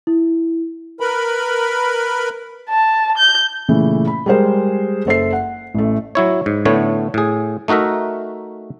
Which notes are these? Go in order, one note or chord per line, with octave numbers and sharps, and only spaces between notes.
E4
A#4 B4 B5
A5
G6
A#2 C#3 E3 A3
B5
G3 G#3 G#4 A#4 C5
F#1 A4 C5 E5 C7
F#5
A1 A3
F#3 E4 C#5
G#2
A2 D3 A3 B3 C#5
A2 G#4
A3 D#4 F#4 A#4 E5